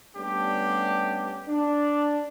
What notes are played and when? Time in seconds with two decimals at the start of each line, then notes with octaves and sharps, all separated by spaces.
0.17 G3 A3 B3 C#4 D4 G4
1.48 D4